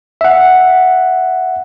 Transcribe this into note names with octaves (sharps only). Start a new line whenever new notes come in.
E5 F#5